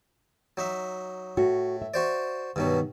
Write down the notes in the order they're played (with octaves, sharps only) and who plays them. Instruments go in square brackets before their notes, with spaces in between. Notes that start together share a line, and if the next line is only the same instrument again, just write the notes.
[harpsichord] F#3 D#4 E5
[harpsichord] A2 [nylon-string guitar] F#4
[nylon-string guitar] E5
[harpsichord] F#4 C5 D5
[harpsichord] G2 B2 F#3 [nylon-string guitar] D#3